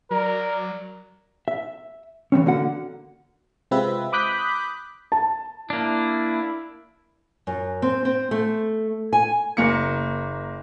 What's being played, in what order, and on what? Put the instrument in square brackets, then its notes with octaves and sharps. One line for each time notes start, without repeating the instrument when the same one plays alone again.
[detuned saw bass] F#3 [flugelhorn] A#4 [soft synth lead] D5
[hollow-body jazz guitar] E5
E3 G3 C4 C#4
D3 A#3 F#4 F#5
[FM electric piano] C3 G#3 C4 F4 B4 E5
B5 D6 D#6 F#6 G6 B6
[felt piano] A5
[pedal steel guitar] A#3 D4 [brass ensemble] E4
[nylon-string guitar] F#2
C4
C4
A3
G#5
[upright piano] F#1 A#3 C#7